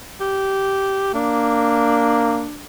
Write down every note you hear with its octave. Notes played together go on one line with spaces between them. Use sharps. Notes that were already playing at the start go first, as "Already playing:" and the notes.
G4
A#3 D4